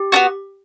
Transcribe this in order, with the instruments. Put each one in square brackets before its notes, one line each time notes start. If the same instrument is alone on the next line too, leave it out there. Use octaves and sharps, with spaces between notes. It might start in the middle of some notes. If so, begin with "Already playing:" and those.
Already playing: [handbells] G4
[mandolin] B3 D4 F#4